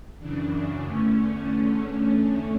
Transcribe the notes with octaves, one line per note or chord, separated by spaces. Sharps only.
F#2 C#3 E3 D4
E2 D3 A3 C#4